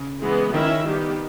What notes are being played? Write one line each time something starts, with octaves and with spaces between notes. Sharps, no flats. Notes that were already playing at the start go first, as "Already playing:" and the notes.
Already playing: C#3
E3 G#3 B3
D#3 C#4 E4 A#4 E5
D#3 G3 B3 G4